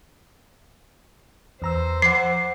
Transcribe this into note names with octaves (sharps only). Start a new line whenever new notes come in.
E2 C5 A#5 E6
F3 F#5 D6 C7